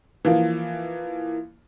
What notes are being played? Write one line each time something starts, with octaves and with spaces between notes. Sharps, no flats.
E3 F3 A#3